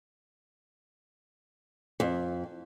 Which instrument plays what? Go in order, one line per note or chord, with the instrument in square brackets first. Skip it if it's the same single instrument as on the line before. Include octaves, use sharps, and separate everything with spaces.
[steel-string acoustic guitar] F2